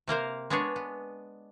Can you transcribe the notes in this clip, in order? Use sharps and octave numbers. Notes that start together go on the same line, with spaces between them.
C3 A#3 A#4 C5
G#3 B3 D4 G#4 C#5
B3